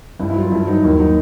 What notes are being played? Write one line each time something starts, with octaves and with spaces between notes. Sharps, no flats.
G2 E4
E4
F#3 F4
G2 E4
F#3 D#4
D#2 E4
F#3 D#4